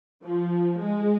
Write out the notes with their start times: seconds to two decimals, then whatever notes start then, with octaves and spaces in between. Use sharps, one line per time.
0.23 F3
0.78 G#3